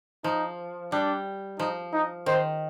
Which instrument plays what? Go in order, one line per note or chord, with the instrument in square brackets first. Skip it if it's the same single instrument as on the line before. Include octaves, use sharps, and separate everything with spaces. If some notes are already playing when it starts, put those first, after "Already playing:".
[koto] F3 [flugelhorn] D#4
[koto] G3 [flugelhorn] D4
[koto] F3 [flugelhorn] D#4
[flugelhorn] D#4
[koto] D#3 [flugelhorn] C5